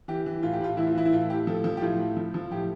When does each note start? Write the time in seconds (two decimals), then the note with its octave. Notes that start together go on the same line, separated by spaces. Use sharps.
0.08 E3 G4
0.26 E3
0.43 A2 F4
0.53 G4
0.61 A2 F4
0.77 E3 E4
0.87 F4
0.95 E3 E4
1.05 E4
1.12 A2 F4
1.30 A2 G4
1.47 F3 A4
1.64 F3
1.77 G4
1.82 A2 F4
1.99 A2
2.17 F3
2.34 F3
2.51 A2 G4